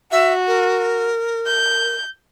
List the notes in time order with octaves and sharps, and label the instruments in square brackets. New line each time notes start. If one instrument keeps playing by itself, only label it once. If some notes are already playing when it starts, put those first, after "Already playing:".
[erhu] F#4 [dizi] E5
[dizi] A#4
[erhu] G6